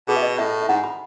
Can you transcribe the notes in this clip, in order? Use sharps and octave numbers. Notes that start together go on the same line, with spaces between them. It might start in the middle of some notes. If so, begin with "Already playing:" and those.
B2 G#4
E5
D#5
A2 E5
E5
G#2 F#5
B5